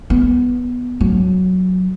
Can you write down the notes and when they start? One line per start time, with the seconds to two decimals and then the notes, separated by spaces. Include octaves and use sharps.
0.10 B3
1.01 F#3